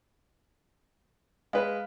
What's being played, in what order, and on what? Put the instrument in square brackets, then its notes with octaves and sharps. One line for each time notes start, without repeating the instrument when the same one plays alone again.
[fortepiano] G#3 B4 [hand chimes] F5